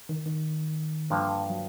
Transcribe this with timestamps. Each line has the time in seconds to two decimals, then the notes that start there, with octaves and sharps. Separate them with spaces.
0.09 D#3
0.26 D#3
1.10 G2 D3 F3 A#3
1.50 F#3